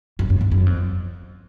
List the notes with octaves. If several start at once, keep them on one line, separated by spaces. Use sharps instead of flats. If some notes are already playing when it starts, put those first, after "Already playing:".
F#2
F#2
F2
F#2
F2